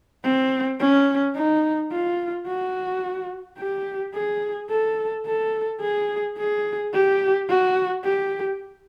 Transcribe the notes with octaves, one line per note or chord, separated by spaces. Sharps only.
C4
C#4
D#4
F4
F#4
G4
G#4
A4
A4
G#4
G#4
G4
F#4
G4